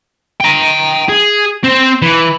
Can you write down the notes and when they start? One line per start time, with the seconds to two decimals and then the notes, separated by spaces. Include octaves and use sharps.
0.40 G5 A#5
1.09 G#4
1.64 C4 C5
2.02 E3